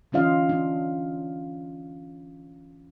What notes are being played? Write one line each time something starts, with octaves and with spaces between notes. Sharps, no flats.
D3 E3 C#4 F4 D#5 F5
D4